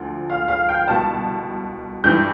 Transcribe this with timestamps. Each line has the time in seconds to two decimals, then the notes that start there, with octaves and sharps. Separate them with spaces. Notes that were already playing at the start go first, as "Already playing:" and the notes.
Already playing: D2 D3 F3
0.30 F5
0.48 F5
0.69 G5
0.87 C2 B2 A5
2.04 G2 E3 G6